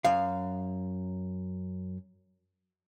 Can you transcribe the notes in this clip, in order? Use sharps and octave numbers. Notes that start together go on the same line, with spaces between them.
F#2 F5